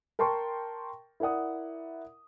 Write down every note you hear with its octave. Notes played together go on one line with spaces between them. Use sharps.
A#4 G5 A5 C6 C#6
E4 A#4 D5 F#5 D#6